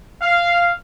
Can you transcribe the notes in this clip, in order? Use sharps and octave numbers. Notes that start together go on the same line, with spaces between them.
F5